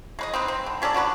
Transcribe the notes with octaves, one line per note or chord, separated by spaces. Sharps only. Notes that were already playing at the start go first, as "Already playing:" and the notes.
G#3 B4 D#5
C4 D#4 B4
C4
D3
F#3 C#4 A4 D5
D3 F#4 A#4 B4